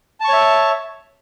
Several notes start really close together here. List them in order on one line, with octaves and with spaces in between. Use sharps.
A5 C#6 C#5 E5